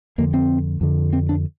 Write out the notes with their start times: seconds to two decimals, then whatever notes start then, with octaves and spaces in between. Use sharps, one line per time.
0.18 F2 D3 A#3
0.34 C4
0.81 F2 D3
1.13 C4
1.29 D4